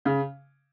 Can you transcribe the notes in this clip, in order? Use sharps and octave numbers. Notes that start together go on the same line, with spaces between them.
C#3